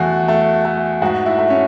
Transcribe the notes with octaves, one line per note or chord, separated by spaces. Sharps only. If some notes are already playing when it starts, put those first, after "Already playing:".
Already playing: E2 A3 F#4
A3
A3
G#2 F#4
E4
A3
C#4